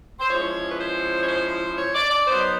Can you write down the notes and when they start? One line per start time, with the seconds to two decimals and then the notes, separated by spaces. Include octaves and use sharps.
0.20 C5
0.31 F3 G#3 C#4 E4 C#5
0.72 B4
0.79 C5
1.22 C#5
1.29 C5
1.78 C#5
1.94 D5
2.10 D5
2.27 F#3 B3 D#4 C5